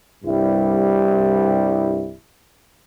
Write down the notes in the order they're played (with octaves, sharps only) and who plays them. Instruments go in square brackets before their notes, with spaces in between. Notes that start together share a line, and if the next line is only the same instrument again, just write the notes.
[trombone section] C2 G2 G3 E4